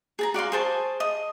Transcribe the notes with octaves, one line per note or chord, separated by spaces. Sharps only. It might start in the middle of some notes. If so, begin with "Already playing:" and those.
G#4 A5 A#5
F#4 D5 F5 C6
G#4 C5 A5 C#6
D#5